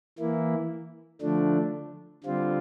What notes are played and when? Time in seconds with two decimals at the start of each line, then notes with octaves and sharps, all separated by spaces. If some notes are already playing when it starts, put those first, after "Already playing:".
0.18 E3 A#3 E4
1.22 D3 F3 A3 D4
2.24 D3 G3 C4 F4